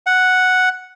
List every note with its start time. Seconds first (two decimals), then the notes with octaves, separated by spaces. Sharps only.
0.06 F#5